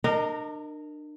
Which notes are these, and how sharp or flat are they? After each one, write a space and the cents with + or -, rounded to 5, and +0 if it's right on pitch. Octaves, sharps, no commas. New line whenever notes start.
D4 +35 A#4 -10 D#5 +0